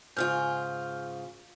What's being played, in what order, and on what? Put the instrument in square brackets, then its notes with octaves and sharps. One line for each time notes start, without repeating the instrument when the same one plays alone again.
[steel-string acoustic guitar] G#2 C#3 F4 [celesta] F6 G6